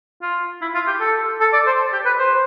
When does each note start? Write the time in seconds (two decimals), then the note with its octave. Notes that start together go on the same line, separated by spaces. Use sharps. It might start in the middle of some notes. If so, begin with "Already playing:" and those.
0.22 F4
0.61 E4
0.75 F4
0.87 G4
1.00 A4
1.40 A4
1.53 D5
1.66 C5
1.93 G4
2.06 B4
2.19 C5